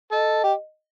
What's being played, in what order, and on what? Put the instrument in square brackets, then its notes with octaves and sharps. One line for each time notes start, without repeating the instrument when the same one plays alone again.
[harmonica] A4 [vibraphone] D#5
[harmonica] G4